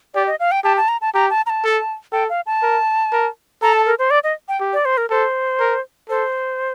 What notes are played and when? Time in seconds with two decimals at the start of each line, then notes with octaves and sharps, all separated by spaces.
0.14 G4 D5
0.27 D#5
0.40 F5
0.51 G5
0.64 G4 A5
0.77 A5
0.88 A#5
1.01 A5
1.14 G4 A#5
1.30 A5
1.46 A#5
1.50 A5
1.64 A4
2.12 A4 G5
2.29 F5
2.46 A5
2.63 A#4
3.13 A#4
3.62 A4 A#5
3.73 A5
3.86 A#4
3.99 C5
4.11 D5
4.24 D#5
4.48 G5
4.60 G4
4.73 D5
4.85 C5
4.97 A#4
5.10 A4 C5
5.60 A#4
6.09 A4 C5